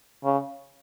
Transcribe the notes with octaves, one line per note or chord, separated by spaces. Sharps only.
C#3